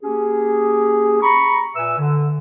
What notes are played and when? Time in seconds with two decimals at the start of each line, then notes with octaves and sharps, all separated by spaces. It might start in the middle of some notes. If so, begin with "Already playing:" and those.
0.03 A#3 C#4 G4 G#4
1.22 A#5 B5 C#6
1.75 A#2 B4 E5 G#5 E6
1.98 D3